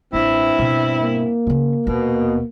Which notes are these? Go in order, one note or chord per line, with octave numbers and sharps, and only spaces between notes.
A1 G2 G3 C4 E4
B2 B3
A#3
C#3 C#4
D#1 B2 B3